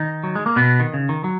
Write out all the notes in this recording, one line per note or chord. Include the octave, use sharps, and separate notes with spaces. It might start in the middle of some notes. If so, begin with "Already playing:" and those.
Already playing: D#3 D#4
F#3
G#3
A#3
B2 B3
D#3
C#3
D#3
F#3